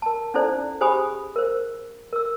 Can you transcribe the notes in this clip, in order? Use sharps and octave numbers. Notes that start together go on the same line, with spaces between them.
A#4 A5
C#4 D#4 E4 A4 C5 D5
G4 G#4 C5 G#5 B5 D#6
A#4 C5
A#4 E6